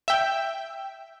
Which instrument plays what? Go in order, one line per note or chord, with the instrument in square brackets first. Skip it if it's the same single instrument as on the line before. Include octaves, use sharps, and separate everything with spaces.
[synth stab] E5 G5